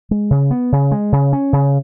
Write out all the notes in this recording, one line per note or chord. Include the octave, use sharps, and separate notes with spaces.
G#3
C#3
B3
C#3
G#3
C#3
C#4
C#3